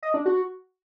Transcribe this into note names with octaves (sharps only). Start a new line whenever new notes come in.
D#5
D4
F#4